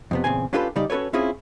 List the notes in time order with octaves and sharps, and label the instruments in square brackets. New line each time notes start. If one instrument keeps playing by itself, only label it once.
[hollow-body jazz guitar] F2 C3 B3
E2 A#2 C#3 C4 G#5
C#4 D4 F4 G4 A4 B4
C#3 G3 D#4 D5
C#4 F#4 A4 B4 C#5
C4 C#4 E4 F4 G#4